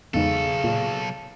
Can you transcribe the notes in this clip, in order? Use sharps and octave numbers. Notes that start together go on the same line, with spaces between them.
B1 E2 G#2 C#3 A4
A#2